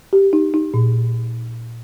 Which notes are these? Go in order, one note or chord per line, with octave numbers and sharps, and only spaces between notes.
G4
D#4
D#4
A#2